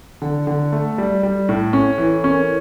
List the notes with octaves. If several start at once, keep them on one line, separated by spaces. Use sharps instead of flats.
D3 A4
D3
A3
G3
G3
A2
C#4 A4
A4
E3
A4
C#4
A#4